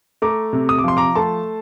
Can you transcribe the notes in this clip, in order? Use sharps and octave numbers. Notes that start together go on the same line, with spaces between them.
A3 A#5 D6
C3
D#6
D6
F3 C6
A#5 D6
A3 A5 C6